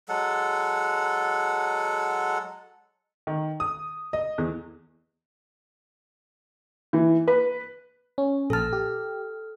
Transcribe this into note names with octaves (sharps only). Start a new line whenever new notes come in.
F#3 G#3 A4 F#5
D#3
D#6
D#5
E2
E3
B4
C#4
A#1 A4 A5 F6
G4